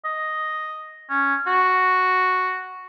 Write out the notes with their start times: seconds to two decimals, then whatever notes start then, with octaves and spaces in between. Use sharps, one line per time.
0.05 D#5
1.09 C#4
1.47 F#4